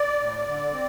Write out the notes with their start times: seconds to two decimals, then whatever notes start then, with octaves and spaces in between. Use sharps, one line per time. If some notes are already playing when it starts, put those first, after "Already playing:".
Already playing: D5
0.19 A2
0.47 D3
0.73 C4